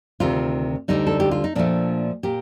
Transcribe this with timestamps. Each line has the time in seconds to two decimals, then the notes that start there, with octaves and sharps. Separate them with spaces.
0.20 D2 C3 D#3 F4
0.88 D2 D3 G3 D#4
1.07 A4
1.20 G4
1.31 F4
1.44 D#4
1.56 A#2 F3 A3 D4
2.23 A#2 G4